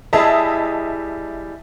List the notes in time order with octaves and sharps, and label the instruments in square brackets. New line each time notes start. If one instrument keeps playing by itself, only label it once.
[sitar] G3 E4 G#4 [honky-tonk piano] D#5 E5 A5